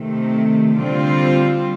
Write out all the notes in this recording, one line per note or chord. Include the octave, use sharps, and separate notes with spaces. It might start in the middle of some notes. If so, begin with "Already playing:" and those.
Already playing: C3 D#3 A3
D3 G3 C4 F4